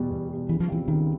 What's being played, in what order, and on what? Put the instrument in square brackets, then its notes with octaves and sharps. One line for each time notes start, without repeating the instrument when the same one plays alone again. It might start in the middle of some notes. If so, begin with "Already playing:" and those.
Already playing: [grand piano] E2 B2 G3
E2
B2 G3
[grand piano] C#2 [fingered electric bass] E3
[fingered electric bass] F3
[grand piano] B2 G3 C4 F4 [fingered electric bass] E3
[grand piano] C#2 [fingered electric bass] D#3